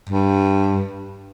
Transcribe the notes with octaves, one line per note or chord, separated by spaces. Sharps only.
G2